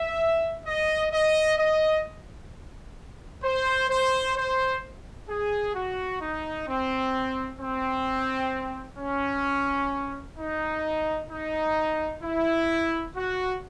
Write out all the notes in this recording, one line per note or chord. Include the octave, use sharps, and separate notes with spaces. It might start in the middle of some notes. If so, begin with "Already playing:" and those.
Already playing: E5
D#5
D#5
D#5
C5
C5
C5
G#4
F#4
D#4
C4
C4
C#4
D#4
D#4
E4
F#4